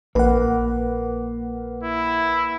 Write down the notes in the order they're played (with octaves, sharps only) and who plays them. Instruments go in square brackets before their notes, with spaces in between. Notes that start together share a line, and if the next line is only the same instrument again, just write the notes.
[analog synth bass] A#1 [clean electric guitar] A#3 [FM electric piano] B4 F#5
[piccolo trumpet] E4